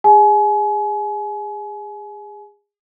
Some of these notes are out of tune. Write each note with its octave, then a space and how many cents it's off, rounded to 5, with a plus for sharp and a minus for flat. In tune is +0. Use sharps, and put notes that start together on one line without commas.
G#4 -25 G#5 +35